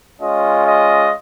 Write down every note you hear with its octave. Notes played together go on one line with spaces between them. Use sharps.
G#3 C#4 F4 D#5
D#5